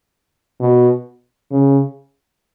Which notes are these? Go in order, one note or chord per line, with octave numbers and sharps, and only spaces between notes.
B2
C#3